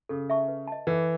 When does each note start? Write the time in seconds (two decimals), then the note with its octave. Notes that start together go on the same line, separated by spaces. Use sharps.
0.09 C#3 A4
0.30 E5 A5 C#6
0.48 B4
0.67 D#5 A5
0.87 E3 A4